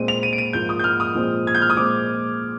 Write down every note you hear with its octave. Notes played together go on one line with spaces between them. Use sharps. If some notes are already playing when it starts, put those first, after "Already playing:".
Already playing: A#2 G#3 C4 D#7
F7
D#7
D7
D#7
G#2 F3 A#3 G6
D#6
G6
F6
D#6
A#2 F3 G#3 C4
G#6
G6
F6
D#6
A#2 G#3 C4 D6